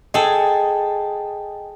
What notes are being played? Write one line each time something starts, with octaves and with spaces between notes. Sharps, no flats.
G#4 A4 D#5 G5 G#5